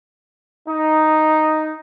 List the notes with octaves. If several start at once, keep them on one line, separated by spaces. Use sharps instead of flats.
D#4